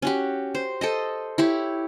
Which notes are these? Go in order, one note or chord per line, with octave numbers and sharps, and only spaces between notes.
C#4 F#4 G4
C5
A4 C5 D#5
E4 G4 C#5